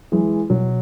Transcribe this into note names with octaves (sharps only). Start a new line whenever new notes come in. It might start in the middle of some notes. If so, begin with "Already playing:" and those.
E3 F#3 G#3
B2 F#3